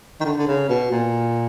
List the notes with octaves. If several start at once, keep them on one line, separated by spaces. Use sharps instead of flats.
D#3
D3
D3
C#3
B2
A#2